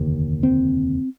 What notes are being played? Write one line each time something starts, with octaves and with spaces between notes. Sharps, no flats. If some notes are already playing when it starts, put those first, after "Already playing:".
Already playing: F1 D#2 D3
C4